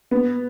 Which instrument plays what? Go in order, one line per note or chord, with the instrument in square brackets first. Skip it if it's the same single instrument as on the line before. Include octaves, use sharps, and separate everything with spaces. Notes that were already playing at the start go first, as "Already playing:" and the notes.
[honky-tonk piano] B3